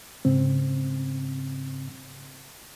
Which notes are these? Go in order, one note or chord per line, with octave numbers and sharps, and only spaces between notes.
G#2 C#3 C4